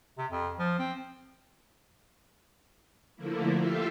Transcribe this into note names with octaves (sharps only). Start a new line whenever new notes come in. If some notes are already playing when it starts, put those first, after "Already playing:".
C3
F2
F3
C4
D3 F3 A3 A#3 E4
F4 G4 A4 E5 F5